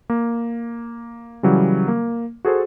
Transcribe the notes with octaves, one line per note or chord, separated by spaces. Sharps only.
A#3
C#3 E3 F#3 G3
A#3
F#4 G#4 A4 C5